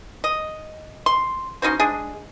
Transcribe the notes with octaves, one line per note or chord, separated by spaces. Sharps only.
D#5
C6
C#4 D#4 F#4 C5
G#3 D4 G#4